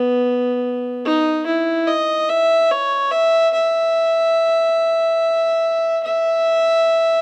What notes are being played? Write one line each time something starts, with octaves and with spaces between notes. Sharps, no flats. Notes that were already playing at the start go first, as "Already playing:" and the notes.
Already playing: B3
D#4
E4
D#5
E5
C#5
E5
E5
E5